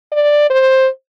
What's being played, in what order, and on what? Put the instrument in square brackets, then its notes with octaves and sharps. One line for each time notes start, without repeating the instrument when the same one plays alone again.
[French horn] D5
C5